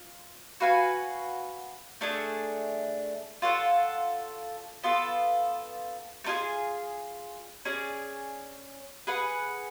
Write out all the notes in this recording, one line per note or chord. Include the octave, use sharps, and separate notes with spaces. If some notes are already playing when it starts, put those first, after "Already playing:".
Already playing: F4
F#4 B4 F5 G#5
A3 D4 G#4
F4 A4 C#5 F#5
B3 F4 A4
A3 D4 F4 G#4
C#4 G#4 D5
G#4 B4 F#5